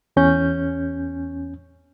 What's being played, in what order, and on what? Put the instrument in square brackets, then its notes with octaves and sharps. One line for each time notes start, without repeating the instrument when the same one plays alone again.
[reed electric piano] E2 C#4 G6